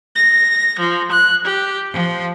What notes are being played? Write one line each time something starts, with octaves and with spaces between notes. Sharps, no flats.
A#6
F3
F#6
G4
F3